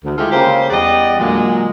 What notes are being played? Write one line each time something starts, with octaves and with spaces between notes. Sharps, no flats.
D2
G#3 E4 F4 G4 A4
C#3 A#3 G4 C5
E2 G3 D5 D#5 F#5
A#2 D3 F#3 G#3